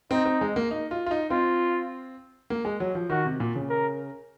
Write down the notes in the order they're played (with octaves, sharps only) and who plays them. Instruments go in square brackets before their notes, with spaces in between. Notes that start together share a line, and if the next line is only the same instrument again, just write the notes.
[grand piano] C4 [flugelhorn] D#4
[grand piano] C4
G#3
A#3
D#4
F4
F4
D#4
[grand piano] C4 [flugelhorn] F4
[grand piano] A#3
G#3
F#3
F3
[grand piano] D#3 [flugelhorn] F#4
[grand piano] C3
A#2
C#3
[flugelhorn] A#4